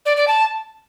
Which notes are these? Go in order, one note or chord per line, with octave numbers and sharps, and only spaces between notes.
D5
D5
A5